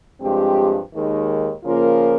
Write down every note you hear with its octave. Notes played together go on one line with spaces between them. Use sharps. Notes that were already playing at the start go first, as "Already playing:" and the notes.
G2 F3 G#3 C4 G4
D#2 D#3 G#3
C#3 F3 A#3 F4 A#4